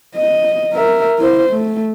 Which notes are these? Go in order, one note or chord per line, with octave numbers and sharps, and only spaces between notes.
D#5
A#4 E5
E4 C5
A3